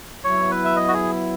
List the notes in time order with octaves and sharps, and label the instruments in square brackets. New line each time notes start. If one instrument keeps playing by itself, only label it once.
[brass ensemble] F#3 B3 E4 [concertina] C#5
[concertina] B4
E5
D#5
F#4
G#4